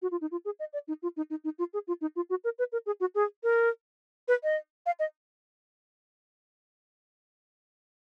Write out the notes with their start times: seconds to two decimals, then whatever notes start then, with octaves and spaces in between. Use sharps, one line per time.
0.02 F#4
0.11 F4
0.21 D#4
0.31 F4
0.45 G#4
0.60 D#5
0.73 D5
0.88 D#4
1.02 F4
1.17 D#4
1.30 D#4
1.44 D#4
1.59 F4
1.73 G#4
1.87 F4
2.01 D#4
2.16 F4
2.30 F#4
2.44 A#4
2.59 B4
2.72 A#4
2.86 G#4
3.00 F#4
3.15 G#4
3.43 A#4
4.28 B4
4.43 D#5
4.86 F5
4.99 D#5